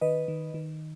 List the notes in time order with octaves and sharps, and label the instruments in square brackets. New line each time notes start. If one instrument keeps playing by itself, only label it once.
[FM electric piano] D#3 B4 D#5
D#3
D#3